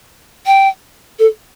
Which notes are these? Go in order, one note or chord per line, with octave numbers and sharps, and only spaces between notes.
G5
A4